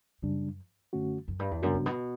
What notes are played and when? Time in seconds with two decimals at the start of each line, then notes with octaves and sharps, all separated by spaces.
0.22 F#2 C#3 G3 D4
0.93 F#2 D3 A3 C#4 F#4
1.28 F#2
1.39 G2
1.51 E2
1.62 F#2 C#3 G3 B3 D4 F#4
1.74 G2
1.86 B2